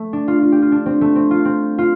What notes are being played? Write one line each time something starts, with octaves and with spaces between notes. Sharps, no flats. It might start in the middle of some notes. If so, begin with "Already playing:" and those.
Already playing: A3
D4
F4
F4
G4
F4
D4
C4
A3
C4
F4
C4
F4